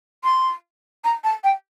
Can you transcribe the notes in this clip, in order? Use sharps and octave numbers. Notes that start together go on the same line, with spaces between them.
C6
A#5
A5
G5